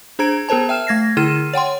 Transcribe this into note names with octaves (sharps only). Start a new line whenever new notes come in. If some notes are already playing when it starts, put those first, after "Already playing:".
D4 G#4 C5 A#5 G#6 D7
B3 G#4 A#4 C5 A5
E5 G5 F6 E7
A3 G#6 A#6 C7
D3 E4 G#4 F6 D#7 E7
C#5 F#5 G5 C6